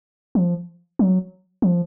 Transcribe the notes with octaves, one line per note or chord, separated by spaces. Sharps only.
F3
F#3
F3